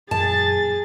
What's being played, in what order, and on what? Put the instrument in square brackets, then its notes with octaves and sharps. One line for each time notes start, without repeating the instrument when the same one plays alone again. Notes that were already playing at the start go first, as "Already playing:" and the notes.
[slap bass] F#2 A#2 E3 [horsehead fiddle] G#4 [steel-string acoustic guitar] A5 [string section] A6